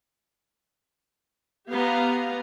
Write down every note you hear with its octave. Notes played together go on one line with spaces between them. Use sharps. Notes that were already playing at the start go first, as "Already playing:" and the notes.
B3 G4 F5 A#5